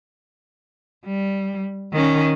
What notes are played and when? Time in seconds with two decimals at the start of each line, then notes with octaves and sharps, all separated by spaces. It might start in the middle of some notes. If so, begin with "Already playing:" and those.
1.06 G3
1.93 D#3 C#4